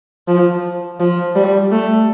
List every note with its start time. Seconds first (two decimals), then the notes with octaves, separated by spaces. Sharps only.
0.28 F3
1.00 F3
1.36 G3
1.72 A3